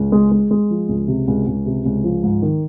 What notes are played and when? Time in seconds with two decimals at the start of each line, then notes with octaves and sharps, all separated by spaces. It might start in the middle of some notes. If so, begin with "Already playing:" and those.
Already playing: C#2
0.12 G#3
0.31 G#3
0.51 G#3
0.70 F3
0.89 C#2
1.08 C3
1.27 C#2
1.47 C#2
1.66 C3
1.86 C#2
2.04 F3
2.23 G#2
2.42 D#3